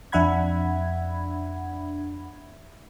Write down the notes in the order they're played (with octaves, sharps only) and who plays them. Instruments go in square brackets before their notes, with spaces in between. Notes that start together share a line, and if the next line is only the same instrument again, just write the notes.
[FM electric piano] F2 D4 E5 F#5 B5 G#6